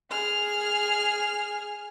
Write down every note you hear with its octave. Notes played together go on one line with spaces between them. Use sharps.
G#4 F6